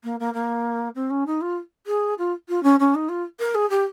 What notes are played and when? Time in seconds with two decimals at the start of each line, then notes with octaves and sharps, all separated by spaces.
0.04 A#3
0.20 A#3
0.34 A#3
0.95 C4
1.10 C#4
1.26 D#4
1.41 F4
1.86 G#4
2.18 F4
2.49 F4
2.63 C#4
2.79 C#4
2.95 D#4
3.09 F4
3.40 A#4
3.55 G#4
3.70 G4